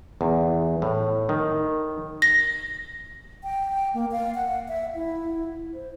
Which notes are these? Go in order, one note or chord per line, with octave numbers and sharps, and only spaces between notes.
E2
A2
D#3
A#6
G5
A#3
F5
F#5
E5
E4
C5